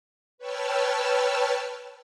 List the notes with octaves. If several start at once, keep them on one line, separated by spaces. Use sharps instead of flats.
B4 C#5 G5 A5 E6 F6